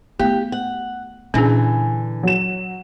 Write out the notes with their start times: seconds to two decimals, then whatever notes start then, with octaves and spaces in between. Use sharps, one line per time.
0.19 A3 B3 E4 G4
0.52 F#5
1.34 A#2 D3 E3 C#4 D4 G#4
2.23 F#3 E7